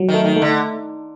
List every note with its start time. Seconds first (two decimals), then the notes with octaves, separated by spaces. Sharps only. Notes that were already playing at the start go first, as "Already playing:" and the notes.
Already playing: F#3
0.08 D#3
0.14 A3
0.24 D#3
0.36 A3
0.42 D3